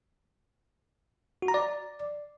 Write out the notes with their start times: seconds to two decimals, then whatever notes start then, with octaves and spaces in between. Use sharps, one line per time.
1.42 F#4
1.48 A#5
1.54 D5